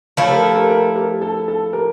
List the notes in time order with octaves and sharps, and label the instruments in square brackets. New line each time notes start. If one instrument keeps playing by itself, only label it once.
[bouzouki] F3 A3 E4 [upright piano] A4 C#5
[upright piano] G4 A#4
A4
G4 A#4
G4 A#4
G4 A#4
A4
A4
G4 A#4